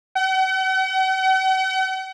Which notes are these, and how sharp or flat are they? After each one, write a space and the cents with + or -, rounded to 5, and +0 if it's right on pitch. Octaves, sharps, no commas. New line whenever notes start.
F#5 +45